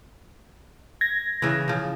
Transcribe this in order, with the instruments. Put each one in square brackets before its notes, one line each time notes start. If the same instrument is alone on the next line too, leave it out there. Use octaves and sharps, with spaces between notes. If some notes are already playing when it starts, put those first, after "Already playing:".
[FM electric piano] G#6 A#6
[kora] C#3 E3
C#3 F3